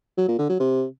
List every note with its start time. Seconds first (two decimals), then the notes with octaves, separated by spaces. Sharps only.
0.17 F#3
0.28 A#2
0.39 D3
0.49 F#3
0.60 C3